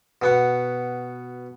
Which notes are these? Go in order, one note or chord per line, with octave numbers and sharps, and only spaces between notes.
B2 B3 F#5